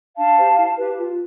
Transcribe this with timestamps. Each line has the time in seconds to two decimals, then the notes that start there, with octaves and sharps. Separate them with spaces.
0.17 D4 F5 A5
0.37 G4 C5
0.57 E4
0.77 G4 B4
0.97 F4